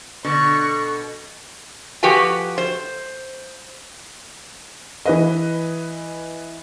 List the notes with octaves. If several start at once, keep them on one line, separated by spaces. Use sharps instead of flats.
B2 D3 C#6
F3 F#4 G4 B4 G5 G#5
C5
E3 B4 D#5